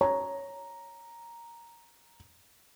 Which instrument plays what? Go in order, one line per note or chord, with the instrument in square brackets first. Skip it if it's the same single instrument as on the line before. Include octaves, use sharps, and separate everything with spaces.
[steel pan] C#5 [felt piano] A#5